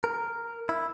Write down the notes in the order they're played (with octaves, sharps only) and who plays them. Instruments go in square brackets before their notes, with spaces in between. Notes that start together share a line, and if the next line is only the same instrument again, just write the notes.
[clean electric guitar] A#4
E4